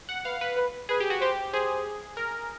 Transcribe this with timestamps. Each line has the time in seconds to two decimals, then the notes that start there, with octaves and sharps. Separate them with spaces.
0.09 F#5
0.25 B4 F5
0.41 B4
0.57 B4
0.89 G#4 B4
1.00 G4
1.10 F#4
1.21 G4 C5
1.53 G#4 C5
2.17 A#4